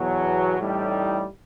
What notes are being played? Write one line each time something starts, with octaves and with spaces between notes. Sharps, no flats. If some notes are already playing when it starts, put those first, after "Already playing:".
Already playing: E2 B2 F#3
A1 A2 G3 D#4